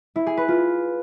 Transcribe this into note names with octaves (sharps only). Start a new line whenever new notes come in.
E4
G#4
B4
F4